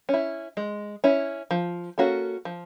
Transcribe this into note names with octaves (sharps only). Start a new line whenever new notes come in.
C#4 E4
G#3
C#4 E4
F3
A#3 C#4 F#4 A4
F3